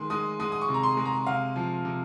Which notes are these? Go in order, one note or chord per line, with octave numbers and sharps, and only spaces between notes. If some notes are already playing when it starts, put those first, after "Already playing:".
Already playing: D#3 G#3 C6
G#3 D#6
G#3 D#6
D#6
C#6
C3
A#5
C6
G#3
A#5
C3 F5
F3
C3